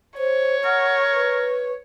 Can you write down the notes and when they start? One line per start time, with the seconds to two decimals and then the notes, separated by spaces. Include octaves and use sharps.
0.18 C5 C#5
0.65 A#4 F#5
1.13 B4